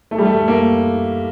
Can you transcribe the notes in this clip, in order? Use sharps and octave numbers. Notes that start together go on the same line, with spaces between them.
A3
G3
A3
A#3